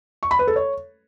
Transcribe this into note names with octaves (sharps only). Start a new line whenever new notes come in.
C#6
B5
B4
A4
C#5